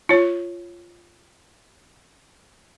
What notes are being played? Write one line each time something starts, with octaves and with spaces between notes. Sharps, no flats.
F4 C#5